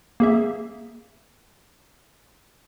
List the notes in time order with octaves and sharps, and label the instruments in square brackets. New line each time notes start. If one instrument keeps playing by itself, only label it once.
[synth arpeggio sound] A#3 G#4 E5